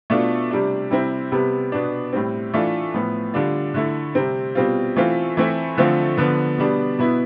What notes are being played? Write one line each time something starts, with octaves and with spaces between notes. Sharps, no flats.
B2 A3 D4 F4
C3 G3 D4
C3 G3 C4 E4
C3 G3 B3
B2 B3 D4
A2 G3 C4
E3 A3 D4 F4
A2 F3 B3
D3 G3 D4 F4
D3 A3 E4
C3 G3 C4
B2 G3 C4 F4
E3 A3 C4 F4
E3 A3 C4 E4
D3 F3 A3 C4 F4
D3 F3 B3
B2 G3 B3 D4
B2 B3 E4